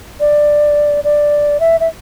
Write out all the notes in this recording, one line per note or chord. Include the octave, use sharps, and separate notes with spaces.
D5
D5
E5
E5